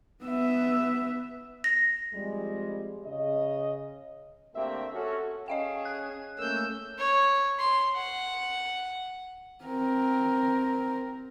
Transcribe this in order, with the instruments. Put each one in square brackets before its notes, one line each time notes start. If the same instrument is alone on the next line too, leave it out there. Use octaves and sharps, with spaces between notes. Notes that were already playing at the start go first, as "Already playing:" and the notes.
[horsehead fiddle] B3 E5
[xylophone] A#6
[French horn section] F2 G3 G#3
C#3 D#5
[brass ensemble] D2 A3 A#3 C4 G4 E5
C#4 F#4 A4
[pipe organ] C#4 [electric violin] G#4 [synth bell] D#5 F5 G5
[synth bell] F#6
[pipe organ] A3 A#3 C#4 [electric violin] E6 G6
[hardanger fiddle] C#5
C6
F#5
[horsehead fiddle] C4 A#4